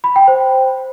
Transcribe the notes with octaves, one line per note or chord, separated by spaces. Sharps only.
B5
G5
C5